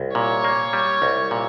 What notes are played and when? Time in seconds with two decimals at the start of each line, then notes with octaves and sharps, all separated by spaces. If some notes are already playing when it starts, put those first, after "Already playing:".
Already playing: C2
0.15 A#2 C#5
0.44 A#3
0.73 G3
1.02 C2
1.31 A#2